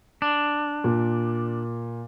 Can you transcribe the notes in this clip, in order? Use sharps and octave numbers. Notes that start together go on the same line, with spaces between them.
D4
A#2